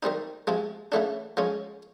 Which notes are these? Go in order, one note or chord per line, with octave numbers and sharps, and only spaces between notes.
D#3 G3 C4 D#4
C3 F3 G#3
C#3 E3 A3 D4
F3 G#3 C#4